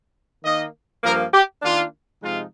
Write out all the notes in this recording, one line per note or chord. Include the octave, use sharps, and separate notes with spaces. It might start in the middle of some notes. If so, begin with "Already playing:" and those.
D#3 A#3 D#4 D#5
G2 F3 A#3 A#4
G4
D#3 A#3 D4 F4
C3 F3 G#3 D#4 F4